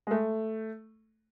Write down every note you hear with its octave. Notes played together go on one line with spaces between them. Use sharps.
G#3
A3